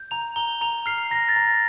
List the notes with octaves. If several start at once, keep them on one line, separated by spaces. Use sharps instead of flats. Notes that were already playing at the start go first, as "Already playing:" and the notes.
Already playing: G6
A#5 F7
A#5 G7
A#5 F7
F6 C7
A#5 A#6
A6
A#5